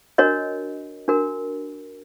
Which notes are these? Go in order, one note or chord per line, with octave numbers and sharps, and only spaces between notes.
D4 F#4 A#4 C#5 D#5
D4 F#4 A#4